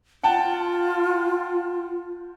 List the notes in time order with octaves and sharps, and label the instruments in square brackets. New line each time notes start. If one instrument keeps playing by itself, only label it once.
[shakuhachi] F4 [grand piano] F#5 G5 A5